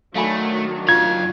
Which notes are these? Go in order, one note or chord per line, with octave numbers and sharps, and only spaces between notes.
D#3 F#3 A3 D4 F5 G#5 B5
F#2 F4 F5 G#6